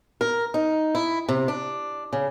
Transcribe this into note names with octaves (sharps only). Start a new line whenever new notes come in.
A#4
D#4
E4
C3
D4
C#3